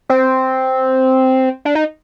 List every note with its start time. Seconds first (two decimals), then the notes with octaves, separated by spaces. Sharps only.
0.09 C4
1.65 D4
1.75 D#4